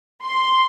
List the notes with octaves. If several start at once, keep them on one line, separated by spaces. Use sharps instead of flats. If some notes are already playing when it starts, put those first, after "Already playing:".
C6